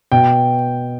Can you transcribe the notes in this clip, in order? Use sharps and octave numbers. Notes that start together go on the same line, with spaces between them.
B2 G5